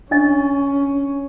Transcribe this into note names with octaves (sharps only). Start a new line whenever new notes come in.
C#4 D4 D#5